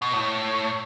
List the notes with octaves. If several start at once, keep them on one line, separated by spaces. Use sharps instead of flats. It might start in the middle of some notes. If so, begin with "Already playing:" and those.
B2
A2